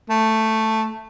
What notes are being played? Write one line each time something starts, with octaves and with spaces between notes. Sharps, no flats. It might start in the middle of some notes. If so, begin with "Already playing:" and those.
A3